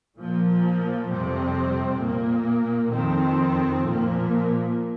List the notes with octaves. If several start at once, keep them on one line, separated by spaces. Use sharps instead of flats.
A#2 F3 A#3
F2 C3 G3 C4
A#2 A#3
F2 D#3 C4
A#2 F3 A#3